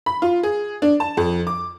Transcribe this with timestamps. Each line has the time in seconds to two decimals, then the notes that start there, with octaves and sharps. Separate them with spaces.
0.06 B5
0.22 F4
0.43 G#4
0.82 D4
1.00 A5
1.17 F2
1.47 D6